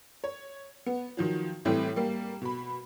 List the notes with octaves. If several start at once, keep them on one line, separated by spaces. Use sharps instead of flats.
C#5
B3
D#3 F3 F#3
A2 E3 G3 A3 C4
G3 A#3
B2 B5